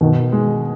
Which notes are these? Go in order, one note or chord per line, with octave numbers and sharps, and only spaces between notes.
B2 D#3
G#3